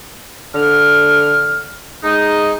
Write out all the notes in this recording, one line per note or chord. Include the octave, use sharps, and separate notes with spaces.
D3 F6
G#3 D#4